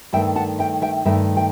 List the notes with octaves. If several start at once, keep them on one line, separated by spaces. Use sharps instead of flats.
G2 D#3 A3 E5 G5
F#5 A5
E5 G5
E5 G5
G2 D#3 A3 E5 G5
E5 G5